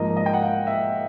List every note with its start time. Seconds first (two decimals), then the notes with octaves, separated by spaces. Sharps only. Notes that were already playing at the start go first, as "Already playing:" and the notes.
Already playing: G#2 F3 A#3 D#5
0.16 D#5
0.26 G5
0.34 F#5
0.42 F5
0.67 E5